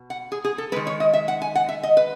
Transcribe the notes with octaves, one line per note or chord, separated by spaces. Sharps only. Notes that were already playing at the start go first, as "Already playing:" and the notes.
Already playing: B2
F#5
G#4
G#4
A4
D#3 G#3 B4
C#5
D#5
E5
F#5
G#5
F#5
E5
D#5
B4